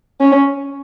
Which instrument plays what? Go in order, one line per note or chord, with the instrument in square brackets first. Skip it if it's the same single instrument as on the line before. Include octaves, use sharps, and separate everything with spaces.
[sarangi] C#4